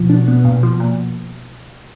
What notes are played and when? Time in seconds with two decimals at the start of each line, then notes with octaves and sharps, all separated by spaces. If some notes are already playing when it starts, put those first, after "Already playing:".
Already playing: B2 F3
0.10 D4
0.28 B3
0.45 A#2
0.63 F3
0.80 A#2